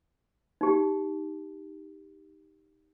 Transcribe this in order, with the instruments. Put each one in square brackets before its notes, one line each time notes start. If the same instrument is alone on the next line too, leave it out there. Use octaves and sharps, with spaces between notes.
[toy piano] D#4 G4